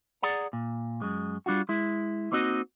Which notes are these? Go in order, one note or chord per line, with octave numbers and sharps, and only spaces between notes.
G#4 D5 F#5 A#5
A#2
F#2 G#3
G3 D4 F4 F#4
G#3 E4
A#3 C4 D#4 F#4 D#5